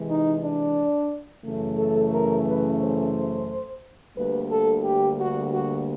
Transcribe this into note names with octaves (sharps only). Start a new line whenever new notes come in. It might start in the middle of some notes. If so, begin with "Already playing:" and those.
Already playing: C3 E3 G#3
D#4
D4
F#2 C#3 E3 A3
A4
A#4
B4
C5
D2 D3 G3 A#3 B4
A4
G4
F#4
F#4